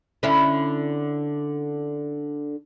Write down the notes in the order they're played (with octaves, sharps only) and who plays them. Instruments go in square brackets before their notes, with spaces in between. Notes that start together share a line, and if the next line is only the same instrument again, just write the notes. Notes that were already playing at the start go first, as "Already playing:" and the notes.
[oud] D3 C#4 E4